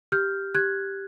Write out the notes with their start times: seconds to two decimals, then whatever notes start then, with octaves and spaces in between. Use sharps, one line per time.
0.12 G4 F6 G6
0.55 G4 F#6 G#6